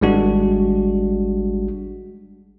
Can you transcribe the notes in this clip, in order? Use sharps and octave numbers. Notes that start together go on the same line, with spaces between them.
G#1 G3 G#3 D4 F#4